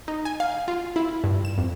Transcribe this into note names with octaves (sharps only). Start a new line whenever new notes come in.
D#4
G#5
F5
F4
E4
G2
E7
F2